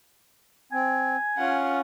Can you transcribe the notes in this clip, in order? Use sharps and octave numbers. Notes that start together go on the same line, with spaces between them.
C4 G#5
C#4 F4 F#5